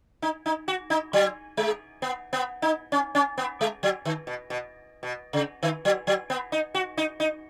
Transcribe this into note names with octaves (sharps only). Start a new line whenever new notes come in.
D#4
D#4
F#4
D#4
F#3
G#3
B3
B3
D#4
C#4
C#4
B3
G#3
F#3
D#3
B2
B2
B2
C#3
D#3
F#3
F#3
B3
D#4
F#4
D#4
D#4